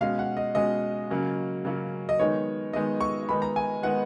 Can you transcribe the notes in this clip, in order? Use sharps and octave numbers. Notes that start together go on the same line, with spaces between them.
B2 G#3 C#4 F5
F#5
D#5
B2 G#3 C#4 D#5
C#3 F#3 A#3 C#4
C#3 F#3 A#3 C#4
D#5
D#3 G#3 B3 D#4 C#5
D#3 G#3 B3 D#4 D#5
C#6
D#3 G#3 B3 D#4 B5
A#5
G#5
D#3 G#3 B3 D#4 F#5